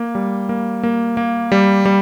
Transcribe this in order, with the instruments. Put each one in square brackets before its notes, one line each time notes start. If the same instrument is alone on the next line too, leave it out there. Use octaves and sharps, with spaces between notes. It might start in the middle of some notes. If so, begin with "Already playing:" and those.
Already playing: [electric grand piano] A#3
G3
A#3
A#3
A#3
G3
G3